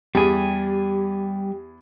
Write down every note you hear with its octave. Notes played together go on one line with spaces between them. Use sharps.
E2 G3 G4 G#4 G#5